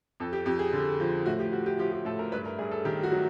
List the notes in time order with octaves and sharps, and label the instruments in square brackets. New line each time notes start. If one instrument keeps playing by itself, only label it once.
[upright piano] F2 A4
G4
F2 G4
G#4
D3
F3
A2 F#4
G4
F3 F#4
G4
F3 G4
G4
A2 A4
A#4
G2 B4
A#4
G2 G#4
A4
D#3 G4
F#4
F#3